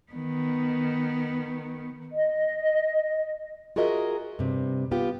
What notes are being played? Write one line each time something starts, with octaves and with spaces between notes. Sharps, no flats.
D#3 B3
D#5
F4 F#4 G#4 A#4 D#5 E5
G2 C3
B3 F4 G4